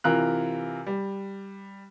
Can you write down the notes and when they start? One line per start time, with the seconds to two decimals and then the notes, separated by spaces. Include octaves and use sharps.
0.04 C3 E3 F4 A#4 F#6
0.87 G3